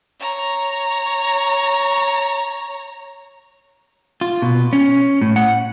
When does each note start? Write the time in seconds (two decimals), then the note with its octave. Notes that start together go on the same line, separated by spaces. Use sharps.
0.20 C#5 A#5
4.21 F4
4.42 B2
4.73 C#4
5.22 A2
5.36 F#5